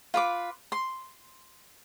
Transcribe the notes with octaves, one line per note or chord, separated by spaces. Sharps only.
F4 B4 D6
C6